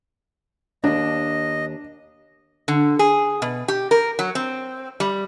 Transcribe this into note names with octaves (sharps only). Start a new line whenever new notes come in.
D#2 G#2 D4 D#5
D3
G#4
B2
G4
A#4
F#3
C4
G3